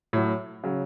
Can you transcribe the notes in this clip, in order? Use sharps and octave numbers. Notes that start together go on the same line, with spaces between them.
A2 F#3
C#3 F#3